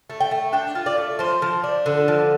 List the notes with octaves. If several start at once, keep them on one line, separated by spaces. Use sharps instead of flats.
A3
G5
A3
D4 G5
F4
D5
A3
F3 C5
F3
D4
D3
F3